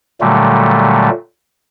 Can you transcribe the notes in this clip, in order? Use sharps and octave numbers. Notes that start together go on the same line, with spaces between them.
A#2 D3 F#3 G3 A3